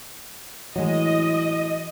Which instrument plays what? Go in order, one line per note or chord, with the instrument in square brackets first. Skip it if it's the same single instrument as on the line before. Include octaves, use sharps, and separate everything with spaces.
[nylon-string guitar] A2 G#3 [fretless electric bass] E3 F#3 [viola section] D#5